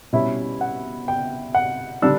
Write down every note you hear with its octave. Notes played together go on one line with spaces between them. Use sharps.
B2 G3 C#4 E4 E5
F#5
G5
F#5
D3 G3 D4 E6